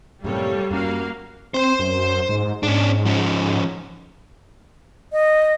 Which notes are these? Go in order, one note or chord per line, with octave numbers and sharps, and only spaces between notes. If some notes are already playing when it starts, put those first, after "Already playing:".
F#2 A2 C3 G3 A#3 A4 C#5
F#2 A#3 C#4 F#4 F5
C4 C5 C6
F#2
G#2
G#2 C#4 D4
F3 C#4
D#5